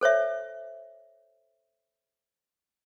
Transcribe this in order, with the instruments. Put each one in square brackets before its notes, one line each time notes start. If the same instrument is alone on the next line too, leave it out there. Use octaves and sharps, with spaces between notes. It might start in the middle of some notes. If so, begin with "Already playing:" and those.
[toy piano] A4 C5 C#5 E5